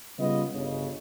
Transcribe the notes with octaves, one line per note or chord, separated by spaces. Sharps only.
C#3 G3 B3 F4 D#5
G1 C#3